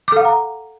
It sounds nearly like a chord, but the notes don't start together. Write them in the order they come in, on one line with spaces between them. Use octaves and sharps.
D6 A4 F5 F#5 A#5